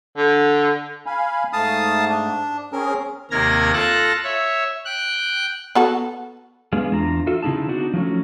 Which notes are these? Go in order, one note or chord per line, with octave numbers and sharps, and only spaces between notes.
D3
F5 G#5 B5
G#2 A3 F5 A5 D#6
D4
C4 C#4 G#4 A#4
D#2 C3 A#3 F6 G#6 A#6
F4 A4 A5 F#6 A#6
C#5 E5
G5 F#6
B3 F#4 A4
G#3 B3 D4 G#4 F5
E2 D4 F4 A#5
F4 F#4 A4 E5
C#3 C4 D#4 E4 G#4 A5
B3 D4 D#4 F#4 D5 F#5
F3 F#3 A3 C#4